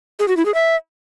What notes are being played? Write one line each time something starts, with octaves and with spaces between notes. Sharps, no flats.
G#4
F#4
E4
G#4
E5